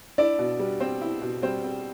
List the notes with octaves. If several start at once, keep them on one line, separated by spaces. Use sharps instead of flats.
D4 E4 D5
B2
G3
C4 C5
E4
B2
G3 C4 C5
C4